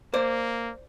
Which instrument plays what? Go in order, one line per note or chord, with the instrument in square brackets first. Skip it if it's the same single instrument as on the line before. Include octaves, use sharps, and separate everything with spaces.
[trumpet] A#3 [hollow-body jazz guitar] C5 D5